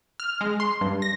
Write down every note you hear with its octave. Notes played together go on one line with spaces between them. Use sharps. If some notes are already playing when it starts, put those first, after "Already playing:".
F6
G#3
C6
G2
A#6